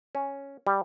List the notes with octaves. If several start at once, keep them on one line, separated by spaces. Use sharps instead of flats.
C#4
G3